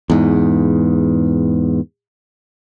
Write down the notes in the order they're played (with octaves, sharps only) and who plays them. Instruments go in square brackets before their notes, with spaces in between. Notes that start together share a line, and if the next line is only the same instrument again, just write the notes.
[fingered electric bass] E2 G#2